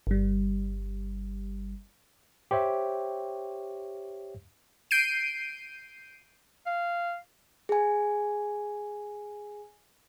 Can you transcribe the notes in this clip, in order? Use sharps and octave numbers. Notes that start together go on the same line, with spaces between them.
G1 G3
G4 C5 C#5 E5
G6 C7 D7 D#7
F5
G#4 G#5